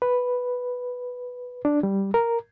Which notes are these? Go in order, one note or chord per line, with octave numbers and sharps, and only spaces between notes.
B4
D4
G3
A#4